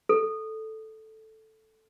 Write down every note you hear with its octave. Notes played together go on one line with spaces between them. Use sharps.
A4